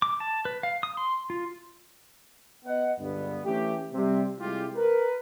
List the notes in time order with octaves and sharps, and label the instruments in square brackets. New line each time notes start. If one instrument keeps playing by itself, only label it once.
[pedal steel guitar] D6
A5
B4
F5
D#6
C6
F4
[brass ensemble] B3 D#5 F#5
C#2 G2 D3 G3 B3
E3 A3 C#4 G4
C3 G3 C4
C3 G3 G#3 E4 F4 G4
A#4 B4